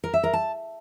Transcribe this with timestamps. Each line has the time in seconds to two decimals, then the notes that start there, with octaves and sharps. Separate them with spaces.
0.04 A#4
0.14 E5
0.24 A#4
0.33 A5